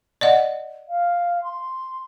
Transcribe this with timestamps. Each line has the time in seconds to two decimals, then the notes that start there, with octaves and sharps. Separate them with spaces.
0.21 D5 D#5 F#5
0.88 F5
1.42 C6